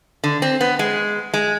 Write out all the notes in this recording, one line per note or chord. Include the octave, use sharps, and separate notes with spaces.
D3
C4
B3
G#3
G#3